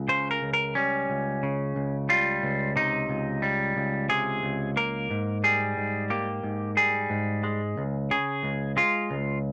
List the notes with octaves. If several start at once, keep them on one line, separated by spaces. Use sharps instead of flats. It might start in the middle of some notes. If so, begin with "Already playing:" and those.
Already playing: C#2
C#3 C5
A#4
C#2
A#4
G3 C#4
C#2
C#3
C#2
G3 F4
C#2
C3 D#4
C#2
G3
C#2
C3 G#4
C#2
A#3 A#4
G#2
G3 G#4
G#2
A#3 G4
G#2
G3 G#4
G#2
G#3
C#2
C#3 G#4
C#2
G#3 F4
C#2